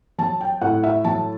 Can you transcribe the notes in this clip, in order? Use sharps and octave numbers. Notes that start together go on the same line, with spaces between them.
F#3 A5
G5
A2 F#5
E5
F#3 A5